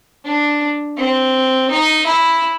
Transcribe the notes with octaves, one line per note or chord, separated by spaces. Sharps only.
D4
C4
D#4
E4